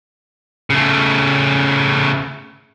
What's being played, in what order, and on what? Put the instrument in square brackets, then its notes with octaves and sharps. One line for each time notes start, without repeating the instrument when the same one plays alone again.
[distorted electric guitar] C#3 A3